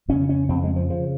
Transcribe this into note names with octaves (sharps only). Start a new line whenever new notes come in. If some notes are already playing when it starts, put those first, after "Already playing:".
F2 C#3 C#4
C#4
F2 C#3 C4
G#3
F3
C#3 F3